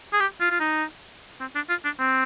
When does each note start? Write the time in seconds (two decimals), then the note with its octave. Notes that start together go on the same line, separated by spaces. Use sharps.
0.13 G#4
0.20 G4
0.40 F4
0.50 F4
0.60 D#4
1.40 C4
1.55 D4
1.69 F4
1.84 D4
1.99 C4